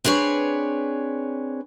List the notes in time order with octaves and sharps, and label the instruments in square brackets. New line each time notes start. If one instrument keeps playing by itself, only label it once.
[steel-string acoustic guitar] C4 D4 G#4 B4 C#5